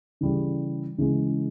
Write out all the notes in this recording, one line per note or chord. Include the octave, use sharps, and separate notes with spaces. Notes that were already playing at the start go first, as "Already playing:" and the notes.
C#3 E3 G3
C#3 E3 G#3